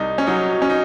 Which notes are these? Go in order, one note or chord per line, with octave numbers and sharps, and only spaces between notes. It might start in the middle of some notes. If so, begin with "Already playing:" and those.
Already playing: C2 D#4
C#4
F#3 D#4
C#4
D#4